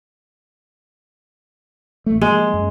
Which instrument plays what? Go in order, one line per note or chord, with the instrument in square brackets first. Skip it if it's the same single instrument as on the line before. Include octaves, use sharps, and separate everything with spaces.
[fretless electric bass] A1 A3
[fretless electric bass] F3 A#3 [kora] G#3
[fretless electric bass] F#2